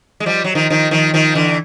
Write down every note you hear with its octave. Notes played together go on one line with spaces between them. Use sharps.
G#3
F3 G3
F#3
D#3 F3
D#3 F3
D#3 F3
D#3 F3
D3 E3